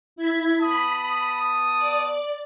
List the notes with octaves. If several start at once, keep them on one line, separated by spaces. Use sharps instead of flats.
E4 G#6 B6
B3 A5 B5 D#6
D5